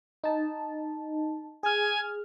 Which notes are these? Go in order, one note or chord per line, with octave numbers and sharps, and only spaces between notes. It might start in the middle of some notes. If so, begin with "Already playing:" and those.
D#4 A5
G#4 G#5 F6